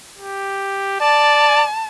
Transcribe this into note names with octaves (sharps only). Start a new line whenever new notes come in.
G4
D5 A5